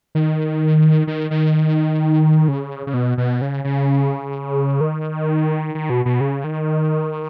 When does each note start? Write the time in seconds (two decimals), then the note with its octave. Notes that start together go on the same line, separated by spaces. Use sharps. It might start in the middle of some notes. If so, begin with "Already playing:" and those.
0.15 D#3
1.07 D#3
1.31 D#3
2.48 C#3
2.87 C#3
2.94 B2
3.18 B2
3.42 C#3
3.64 C#3
4.81 D#3
5.75 D#3
5.90 B2
6.05 B2
6.21 C#3
6.44 D#3